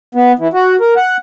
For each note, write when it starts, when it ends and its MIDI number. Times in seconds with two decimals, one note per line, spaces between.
0.15 0.32 59
0.39 0.48 52
0.54 0.76 66
0.81 0.94 70
0.96 1.17 78